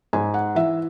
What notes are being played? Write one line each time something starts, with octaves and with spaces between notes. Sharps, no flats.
G#2 G#5
F#5
E3 E5